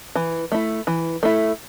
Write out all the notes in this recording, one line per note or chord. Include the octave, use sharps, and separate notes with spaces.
E3
A3 E4
E3
A3 E4